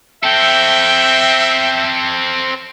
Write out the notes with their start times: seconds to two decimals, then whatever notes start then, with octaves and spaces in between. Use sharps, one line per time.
0.24 C4 A4 E5 G5